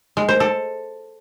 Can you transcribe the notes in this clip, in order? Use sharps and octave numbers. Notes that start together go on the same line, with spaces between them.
G#3
C5
A4